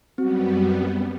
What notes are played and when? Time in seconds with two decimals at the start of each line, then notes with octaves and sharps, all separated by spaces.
0.18 F#2 G3 B3 C4 F#4